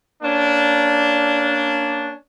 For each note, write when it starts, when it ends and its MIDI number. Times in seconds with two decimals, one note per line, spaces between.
0.23 2.14 58
0.23 2.14 61
0.23 2.14 62